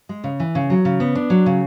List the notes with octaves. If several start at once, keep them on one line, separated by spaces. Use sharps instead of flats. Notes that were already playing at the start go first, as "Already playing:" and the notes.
G#3
C#3
E3
C#3
F#3
C#3
B3
D4
F#3
C#3